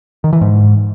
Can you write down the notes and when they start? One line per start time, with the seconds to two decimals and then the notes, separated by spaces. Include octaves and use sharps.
0.24 D#3
0.33 E3
0.41 G#2